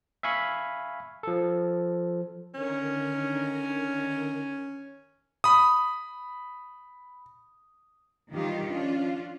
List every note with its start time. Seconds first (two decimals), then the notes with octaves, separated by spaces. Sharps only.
0.23 E5 F5 G#5 B5 C#6
1.23 F3 A4
2.54 D3 D#3 C#4 A#4
5.44 B5 D#6
8.33 D#3 E3 G3 D#4 F4 G4
8.69 F3 C#4 D4 F4